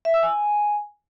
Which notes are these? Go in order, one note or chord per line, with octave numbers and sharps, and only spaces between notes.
E5
E6
G#5